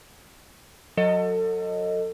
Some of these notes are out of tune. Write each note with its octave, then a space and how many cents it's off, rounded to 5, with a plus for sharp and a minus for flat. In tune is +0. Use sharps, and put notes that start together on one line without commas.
F#3 -20 A4 +30 D#5 +0